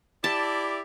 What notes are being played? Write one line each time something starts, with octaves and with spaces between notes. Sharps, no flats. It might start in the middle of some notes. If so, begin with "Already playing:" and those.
E4 G4 D5 A5